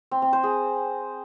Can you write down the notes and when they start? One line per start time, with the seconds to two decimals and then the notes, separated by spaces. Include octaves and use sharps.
0.11 C4
0.22 C4
0.33 C5
0.43 G#4